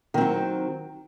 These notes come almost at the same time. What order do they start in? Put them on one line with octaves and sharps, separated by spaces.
D#3 C4 F#3